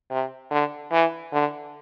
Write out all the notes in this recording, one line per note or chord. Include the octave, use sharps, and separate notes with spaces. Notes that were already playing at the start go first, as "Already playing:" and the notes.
C3
D3
E3
D3